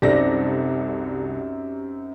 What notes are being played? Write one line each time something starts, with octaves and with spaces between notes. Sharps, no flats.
C2 F#2 C4 D#4 G4 A4 D5 A#6